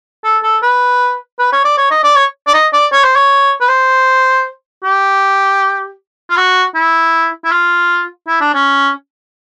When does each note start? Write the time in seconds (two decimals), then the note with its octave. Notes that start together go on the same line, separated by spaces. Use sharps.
0.24 A4
0.43 A4
0.62 B4
1.39 B4
1.52 C#5
1.65 D5
1.78 C#5
1.91 D#5
2.04 D5
2.16 C#5
2.47 D5
2.54 D#5
2.73 D5
2.92 C#5
3.04 C5
3.16 C#5
3.60 B4
3.68 C5
4.84 G4
6.30 F4
6.37 F#4
6.75 E4
7.44 E4
7.52 F4
8.28 E4
8.41 D4
8.54 C#4